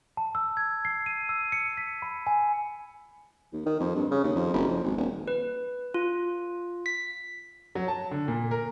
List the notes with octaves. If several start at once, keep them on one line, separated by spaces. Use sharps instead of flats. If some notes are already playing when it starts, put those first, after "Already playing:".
A5
E6
G#6
C7
D#7
E6
C#7
B6
B5
G#5
D#2
D#3
F2
G2
C#3
D#2
F2
F#1
F2
G#1
D#1
B4
F4
B6
F#3
A5
D3
A#2
A#4